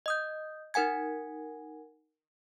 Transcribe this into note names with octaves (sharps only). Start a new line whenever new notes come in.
D#5 D#6 G6
D#4 A#4 F#5 G#5 G#6